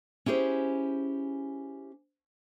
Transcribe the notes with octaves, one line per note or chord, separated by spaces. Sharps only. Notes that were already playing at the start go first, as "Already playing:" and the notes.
C#4 E4 G4 G#4 C5